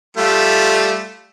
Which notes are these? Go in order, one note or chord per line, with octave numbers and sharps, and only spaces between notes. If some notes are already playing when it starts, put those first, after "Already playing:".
G3 A3 F4